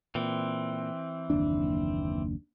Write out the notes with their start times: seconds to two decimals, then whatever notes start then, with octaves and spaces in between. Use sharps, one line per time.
0.15 A#2 E3 C4
1.30 F#1 D#2 D4